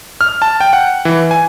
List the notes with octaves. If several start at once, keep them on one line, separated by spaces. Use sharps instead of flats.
F6
A5
G5
F#5
E3
G#5